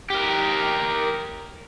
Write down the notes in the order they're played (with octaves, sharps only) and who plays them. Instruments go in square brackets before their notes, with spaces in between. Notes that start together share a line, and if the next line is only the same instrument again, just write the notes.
[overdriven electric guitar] G4 A#4